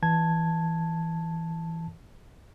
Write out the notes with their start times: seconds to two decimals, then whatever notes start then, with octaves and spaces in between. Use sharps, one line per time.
0.03 E3 A5 G#6